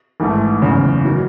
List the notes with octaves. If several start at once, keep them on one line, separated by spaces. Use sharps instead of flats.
A1 G#2 D#3 A3
F#1 E2 C#3
D#3 F#3